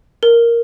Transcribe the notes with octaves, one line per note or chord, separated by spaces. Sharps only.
A#4